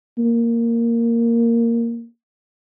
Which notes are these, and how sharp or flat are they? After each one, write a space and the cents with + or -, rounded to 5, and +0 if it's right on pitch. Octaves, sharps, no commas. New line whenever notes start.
A#3 -5